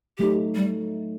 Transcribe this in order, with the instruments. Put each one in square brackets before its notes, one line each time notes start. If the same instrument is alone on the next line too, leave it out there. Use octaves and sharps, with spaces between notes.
[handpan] F#3 A3 D#4 [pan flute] G4
[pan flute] G3